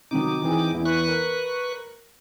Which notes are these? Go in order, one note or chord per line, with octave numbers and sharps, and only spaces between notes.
C3 D#3 F#3 D#4 D6
E3 C4 G#4
E2 E3 E4
B4 C#6 F#6
A#4